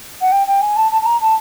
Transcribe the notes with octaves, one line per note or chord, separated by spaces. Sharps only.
F#5
G5
G5
G#5
A5
A5
A5
A#5
A5